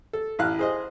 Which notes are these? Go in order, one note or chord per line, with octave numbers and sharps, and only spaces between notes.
A4
A1 E4 F5 F#6
G#4 C5 D#5